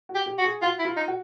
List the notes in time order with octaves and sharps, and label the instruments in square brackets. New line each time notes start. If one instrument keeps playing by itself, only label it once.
[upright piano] F#4
[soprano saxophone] G4
[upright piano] G4
[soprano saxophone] F#4
[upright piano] G#4
[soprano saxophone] F4 [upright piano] F#4
[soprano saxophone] E4
[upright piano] F4
[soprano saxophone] D#4
[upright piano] F#4